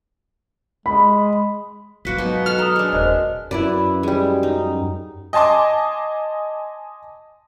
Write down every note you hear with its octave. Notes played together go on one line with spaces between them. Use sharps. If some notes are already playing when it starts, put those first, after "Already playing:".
G#3 B5
G#2 F#3 A#3 F#4 B4 B6 C#7
B2 D#4
A4 F5 F#5 F6
A4 A#5 D#6
G#3 D4
D#1 C4 A#4 C5 D#5
F#2 E4 B4 D5
G3 G#3
D#4
D#5 G#5 A5 C6 D6